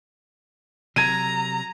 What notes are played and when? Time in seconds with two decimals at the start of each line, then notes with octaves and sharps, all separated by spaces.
0.96 C3 F#3 A#5 G#6 D#7